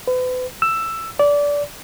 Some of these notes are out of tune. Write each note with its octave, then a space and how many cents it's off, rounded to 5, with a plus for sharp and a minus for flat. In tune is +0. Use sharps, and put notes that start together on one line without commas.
B4 +40
E6 +10
D5 -20